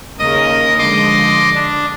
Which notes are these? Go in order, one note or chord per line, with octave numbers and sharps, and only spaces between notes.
D#2 C#3 A#4 D#5 D#6
D3 F3 G#3 D#5 C6 D6
D4